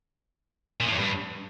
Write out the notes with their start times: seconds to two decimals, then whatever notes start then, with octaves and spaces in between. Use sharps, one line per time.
0.80 A#2
0.86 A2
0.93 E2
0.99 G2